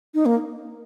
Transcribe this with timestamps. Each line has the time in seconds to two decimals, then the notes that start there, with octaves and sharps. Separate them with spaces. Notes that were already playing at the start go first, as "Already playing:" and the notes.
0.14 D#4
0.26 A#3